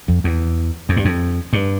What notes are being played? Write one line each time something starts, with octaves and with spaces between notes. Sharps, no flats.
F2
E2
F2
G2
F2
G2